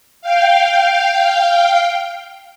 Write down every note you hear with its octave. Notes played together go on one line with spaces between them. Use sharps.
F5 G5